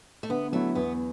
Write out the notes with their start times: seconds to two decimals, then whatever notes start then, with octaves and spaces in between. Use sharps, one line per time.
0.23 A3
0.29 D3 B3
0.52 F#3 A3 B3 E4
0.75 E2 B3